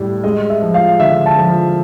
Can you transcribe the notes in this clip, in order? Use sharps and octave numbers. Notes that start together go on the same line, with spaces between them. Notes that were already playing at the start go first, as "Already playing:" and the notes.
Already playing: A2 G3
G#3 D#5
E5
F3
F5
D3 E5
A5
F3